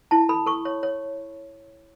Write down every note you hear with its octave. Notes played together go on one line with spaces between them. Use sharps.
E4 A5
A4 B5
A4 C#6
C#5
C#5